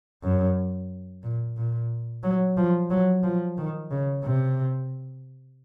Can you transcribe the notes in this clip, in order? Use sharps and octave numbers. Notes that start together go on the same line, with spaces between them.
F#2
A#2
A#2
F#3
F3
F#3
F3
D#3
C#3
C3